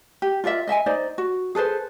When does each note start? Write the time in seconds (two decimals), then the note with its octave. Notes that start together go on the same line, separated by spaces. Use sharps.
0.22 G4
0.44 F4 A#4 D5 E5
0.68 D#5 E5 G5 G#5
0.86 D#4 C5 D5
1.18 F#4
1.55 G#4 A4 B4 C5